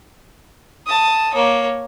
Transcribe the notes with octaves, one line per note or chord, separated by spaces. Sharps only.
A5 D#6
A#3 C#5